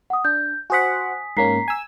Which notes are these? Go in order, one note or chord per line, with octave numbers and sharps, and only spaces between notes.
F#5 D#6
D4 G6
F#4 C5 F#5 G#5 D#6 B6
G#2 A#3 C#4 A#5 B6 C7
G#5 E6